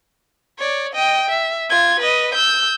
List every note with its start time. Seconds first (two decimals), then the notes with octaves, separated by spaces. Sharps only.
0.59 C#5 D5
0.93 D#5 G5
1.29 E5
1.70 F4 G#6
1.99 B4 D#5
2.34 E6 G6